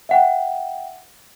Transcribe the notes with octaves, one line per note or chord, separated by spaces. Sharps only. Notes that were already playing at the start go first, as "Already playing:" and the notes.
E5 F#5 G5